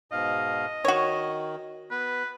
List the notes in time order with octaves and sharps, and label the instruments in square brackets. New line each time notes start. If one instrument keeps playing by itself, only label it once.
[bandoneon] G#2 B2 F5 [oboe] D#5
[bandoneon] D#3 [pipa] F#4 C#5
[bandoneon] B3 [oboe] B4